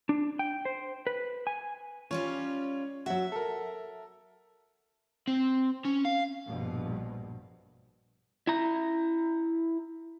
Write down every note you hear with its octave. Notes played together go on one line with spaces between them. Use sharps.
D4
G5
C5
B4
G#5
G3 C#4 F4 C#5
F#3 F#4 E5
A4 A#4
C4
C#4
F5
A#1 G2 B2
E4 A#5